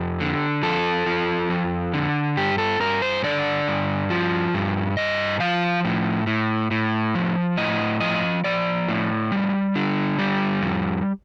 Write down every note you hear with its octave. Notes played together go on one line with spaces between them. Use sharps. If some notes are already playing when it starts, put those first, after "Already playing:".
Already playing: F2 G4
D3
F3 A4
F3
F2
D3
G2 G4
A4
G2 A#4
C5
D3 D5
G2
F3
G2
G2 D#5
F3 F5
A2
A2
A2
F3
A2 D#5
F3 D#5
F3 D5
A2
G3
D3
G3
F2